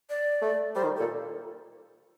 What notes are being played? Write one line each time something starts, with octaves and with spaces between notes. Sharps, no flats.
D5
A3
G3 C5
D#3
A4
A#2